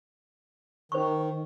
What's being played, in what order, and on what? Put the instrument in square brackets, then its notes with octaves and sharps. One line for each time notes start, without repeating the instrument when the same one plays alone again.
[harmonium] D#3 [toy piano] C5 C#6